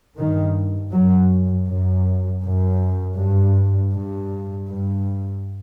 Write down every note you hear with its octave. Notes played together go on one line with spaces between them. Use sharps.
G2 D#3
F#2 F#3
F#2
F#2
G2
G2
G2